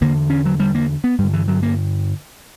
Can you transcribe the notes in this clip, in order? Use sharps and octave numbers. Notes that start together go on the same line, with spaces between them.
E2 D3 A#3
C#4
F#3
G3
A#3
B3
G2 D3 G3
E3
F#3
A#3